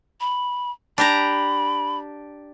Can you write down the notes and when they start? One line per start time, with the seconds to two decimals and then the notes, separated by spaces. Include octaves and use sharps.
0.21 B5
0.98 D4 G4 A#5 B5